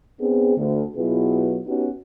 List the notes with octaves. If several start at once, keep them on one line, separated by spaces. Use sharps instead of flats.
B3 C4 D4 G#4
D2
B2 F#3 E4 F4 G#4 B4
B3 C#4 D#4 F#4 G4 B4